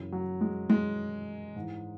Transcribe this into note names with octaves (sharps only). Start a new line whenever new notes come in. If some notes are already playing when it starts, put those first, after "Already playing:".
Already playing: F#2 C#3 E3
F#3
G#3
G#3
G#2 E3